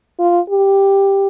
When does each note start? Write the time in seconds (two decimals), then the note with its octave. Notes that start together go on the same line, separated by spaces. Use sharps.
0.19 F4
0.50 G4